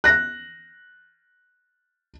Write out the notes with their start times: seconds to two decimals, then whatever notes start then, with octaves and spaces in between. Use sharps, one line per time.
0.04 F#6 A#6